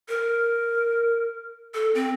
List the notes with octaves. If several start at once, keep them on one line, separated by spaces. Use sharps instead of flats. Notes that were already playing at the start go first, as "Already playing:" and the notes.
A#4
A4
C4